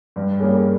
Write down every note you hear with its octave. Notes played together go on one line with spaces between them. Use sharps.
G2
G3 A#3 C#4 G#4